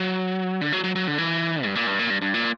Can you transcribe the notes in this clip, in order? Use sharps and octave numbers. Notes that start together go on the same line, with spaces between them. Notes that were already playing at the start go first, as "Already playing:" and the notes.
Already playing: F#3
D3
F#3
F#3
F#3
D3
E3
G2
A#2
G2
A#2
G2
G2
A#2